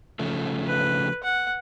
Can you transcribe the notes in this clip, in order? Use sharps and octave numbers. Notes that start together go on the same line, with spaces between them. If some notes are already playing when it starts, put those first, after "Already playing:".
C#3 F3 A3
B4
F#5